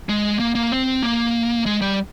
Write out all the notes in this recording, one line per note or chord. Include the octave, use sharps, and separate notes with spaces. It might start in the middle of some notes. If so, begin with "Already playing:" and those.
G#3
A#3
A#3
C4
A#3
G#3
G3